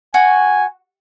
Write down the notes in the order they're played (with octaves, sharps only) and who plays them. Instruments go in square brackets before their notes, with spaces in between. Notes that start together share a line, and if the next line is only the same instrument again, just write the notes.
[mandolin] F#4 [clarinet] G#5